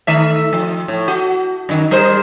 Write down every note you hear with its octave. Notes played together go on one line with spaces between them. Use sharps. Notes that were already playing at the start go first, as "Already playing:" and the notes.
D#3 A3 E5
F3
A2
F#4
F#2 D#3
G3 A#4 C5